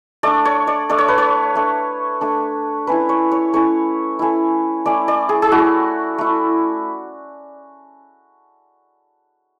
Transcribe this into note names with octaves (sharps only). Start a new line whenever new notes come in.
A3 D4 D5
C#5
D5
A3 D4 D5
C#5
B4
C#5
A3 D4
A3 D4
A3 C#4 E4 B4
C#5
C#5
A3 C#4 E4 C#5
A3 C#4 E4
A3 C#4 E4 D5
D5
G#4
G#4
A3 E4 F#4
A3 E4